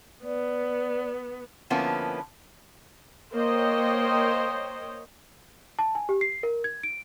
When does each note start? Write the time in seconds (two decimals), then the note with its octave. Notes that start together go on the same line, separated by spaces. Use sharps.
0.24 B3 D5
1.70 D3 F3 A#3 B3 C#4 E4
3.33 A#3 C5 C#5 D#5 G5
5.79 A5
5.95 G#5
6.09 G4
6.21 C7
6.43 A#4
6.64 G#6
6.83 D7